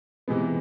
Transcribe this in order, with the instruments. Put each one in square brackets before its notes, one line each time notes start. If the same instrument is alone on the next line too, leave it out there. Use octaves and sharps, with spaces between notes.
[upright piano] C3 E3 G#3 B3